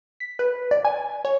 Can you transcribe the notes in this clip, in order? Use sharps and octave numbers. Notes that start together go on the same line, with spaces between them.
B6
B4
D5
G#5
C#5